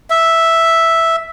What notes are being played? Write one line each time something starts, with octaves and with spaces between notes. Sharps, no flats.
E5